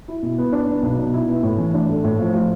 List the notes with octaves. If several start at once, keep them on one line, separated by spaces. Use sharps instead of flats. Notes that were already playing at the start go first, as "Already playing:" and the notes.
E4
B2
B3
D4
B3
B1
B2
E4
B3
A2
E3
D4
A3
A2
F3
F4